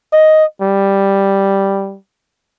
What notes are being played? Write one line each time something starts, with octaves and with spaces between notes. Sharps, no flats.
D#5
G3